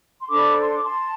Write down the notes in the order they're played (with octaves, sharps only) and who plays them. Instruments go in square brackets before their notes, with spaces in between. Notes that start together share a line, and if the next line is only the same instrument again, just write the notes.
[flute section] C6
D4 A4 C5 B5 D6
C6
D6
A5 C6